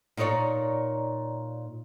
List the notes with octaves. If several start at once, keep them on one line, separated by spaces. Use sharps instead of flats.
A#2 D#4 A#4 C#5 D5